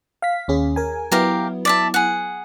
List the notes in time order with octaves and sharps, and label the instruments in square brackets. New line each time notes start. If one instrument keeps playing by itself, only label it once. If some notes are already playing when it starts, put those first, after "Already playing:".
[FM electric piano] F5 B6
D#2 C#4 G#4
A#4 G#5
[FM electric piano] F#3 B3 E4 [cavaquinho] G4 A#4 F5
[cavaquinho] D5 E5 A5
G#4 F#5